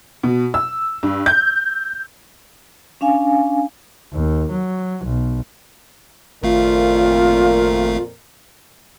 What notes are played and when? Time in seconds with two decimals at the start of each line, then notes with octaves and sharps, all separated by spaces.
0.23 B2
0.54 E6
1.03 G2
1.26 G6
3.01 C#4 D4 F5 G#5
4.13 D#2
4.52 F#3
5.05 B1
6.43 G#1 F2 A#2 A3 F4 A#4 F5